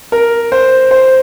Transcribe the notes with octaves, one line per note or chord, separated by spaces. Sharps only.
A#4
C5
C5